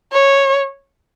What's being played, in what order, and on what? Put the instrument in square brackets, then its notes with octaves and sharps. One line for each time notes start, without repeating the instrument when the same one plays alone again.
[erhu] C#5